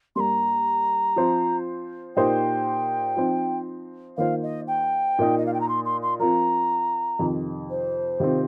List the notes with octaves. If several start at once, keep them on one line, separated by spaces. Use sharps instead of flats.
G2 G3 A#3 A#5 C6
F3 C4 F4 C5
A#2 A#3 D#4 G4 C5 G5
F3 C4 D#4 C5
D#3 A#3 F4 C5 F5
D#5
G5
A#2 A#3 D#4
D#5
F5
G5
A#5
C6
C6
C6
F3 C4 F4 A#4 A#5
F2 C3 D#3 C4
C5
C3 D#3 C4 F4